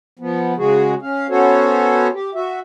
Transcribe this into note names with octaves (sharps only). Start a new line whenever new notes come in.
F3 B3
C#3 G#3 F#4 G#4
C#4 F5
B3 C#4 F#4 A4 C5 C#5
G4
F#4 E5